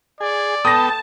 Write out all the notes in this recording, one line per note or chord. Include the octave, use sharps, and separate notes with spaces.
G#4 D5
B3 A4 G5 A5 D#6 A#6